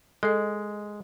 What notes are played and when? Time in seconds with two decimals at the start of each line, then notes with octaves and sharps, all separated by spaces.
0.23 G#3 A4 D#5